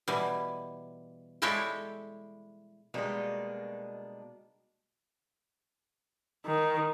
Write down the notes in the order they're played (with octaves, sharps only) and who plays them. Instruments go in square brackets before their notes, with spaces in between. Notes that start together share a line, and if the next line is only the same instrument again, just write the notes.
[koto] B2 E3 G3
G3 G#3 E4 G4 A4 C#5
[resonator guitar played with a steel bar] B2 G3 G#3 [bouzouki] A#3 D4 D#4
[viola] D#3